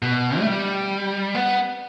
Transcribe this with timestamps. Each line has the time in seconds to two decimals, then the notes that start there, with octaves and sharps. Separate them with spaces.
0.02 B2
0.39 A3
0.47 G3
1.35 B3